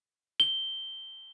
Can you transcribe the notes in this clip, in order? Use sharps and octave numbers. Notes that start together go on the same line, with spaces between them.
G7